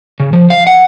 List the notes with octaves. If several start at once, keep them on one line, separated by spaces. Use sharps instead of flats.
C#3
F3
F5
F#5